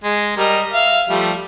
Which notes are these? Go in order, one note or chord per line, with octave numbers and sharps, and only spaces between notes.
G#3
G3 A#4 D#5
E5 F5
F3 G3 A3